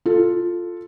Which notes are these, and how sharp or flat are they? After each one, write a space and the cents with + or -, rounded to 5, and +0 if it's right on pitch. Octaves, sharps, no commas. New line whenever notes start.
F4 +0 A4 +0